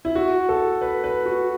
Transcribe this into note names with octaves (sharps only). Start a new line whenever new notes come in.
E4
F#4
A4
B4
B4
F#4